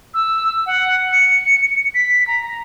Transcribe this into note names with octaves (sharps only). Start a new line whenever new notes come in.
E6
F#5
C#7
B6
A#5